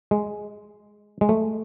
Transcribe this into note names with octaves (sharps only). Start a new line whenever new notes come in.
G#3
G#3
A3